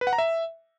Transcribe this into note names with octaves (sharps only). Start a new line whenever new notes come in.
B4
F#5
A#5
E5